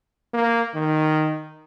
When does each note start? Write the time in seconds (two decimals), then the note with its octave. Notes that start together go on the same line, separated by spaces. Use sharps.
0.33 A#3
0.74 D#3